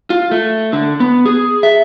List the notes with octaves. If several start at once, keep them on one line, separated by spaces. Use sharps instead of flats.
F4
A3
D3
B3
G#4
E5